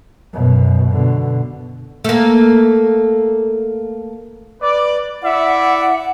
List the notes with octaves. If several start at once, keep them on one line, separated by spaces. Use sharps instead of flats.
F#2 B2
B2 D3
A3 A#3
B4 D5
E4 D5 E5 F#5